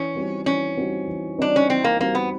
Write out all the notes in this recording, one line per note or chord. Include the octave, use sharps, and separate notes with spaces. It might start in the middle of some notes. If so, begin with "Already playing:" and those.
Already playing: E3 C#4
G3 C4 D#4 F#4
E3 C#4
G3 C4 D#4 F#4
E3
G3 C4 D4 D#4 F#4
C#4
E3 C4
A#3
G3 A#3 C4 D#4 F#4
B3